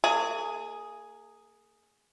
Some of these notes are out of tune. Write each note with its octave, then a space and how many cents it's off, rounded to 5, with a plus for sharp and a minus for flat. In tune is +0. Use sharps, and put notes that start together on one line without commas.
A#3 -40 G#4 +0